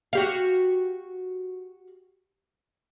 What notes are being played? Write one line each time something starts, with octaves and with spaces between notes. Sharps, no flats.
F#4 G4 F5